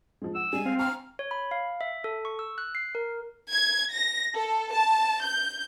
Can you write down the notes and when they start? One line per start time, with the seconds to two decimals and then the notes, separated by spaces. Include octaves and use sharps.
0.22 F3 G#3
0.35 F#5 E6
0.53 G3 G#3 G#5
0.66 C4 F5
0.79 G#5 A#5 C#6 F6
1.19 C#5
1.31 B5
1.51 F5
1.81 E5
2.04 A4
2.25 C#6
2.39 E6
2.58 F#6
2.75 C7
2.95 A#4
3.53 G#6
3.95 A#6
4.36 A4
4.74 A5
5.24 G6